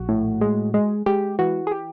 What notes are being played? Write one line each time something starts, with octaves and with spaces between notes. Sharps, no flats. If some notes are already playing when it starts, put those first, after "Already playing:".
Already playing: A#1 F#4
A2
G#3
G#3
G#3 G4
E3 F#4
G#4
G4